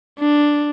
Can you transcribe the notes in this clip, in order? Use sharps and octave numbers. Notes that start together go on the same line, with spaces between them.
D4